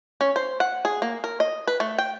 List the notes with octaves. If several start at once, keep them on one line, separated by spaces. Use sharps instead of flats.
C#4
C5
F#5
G#4
A#3
A#4
D#5
B4
A3
G5